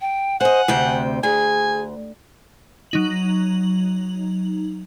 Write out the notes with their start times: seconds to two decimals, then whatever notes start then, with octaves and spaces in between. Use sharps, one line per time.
0.01 G5
0.40 C5 D#5 F#5 G#5
0.68 D2 C3 G5
1.23 D2 G#4 G#5
2.91 F#3 D#4 F#7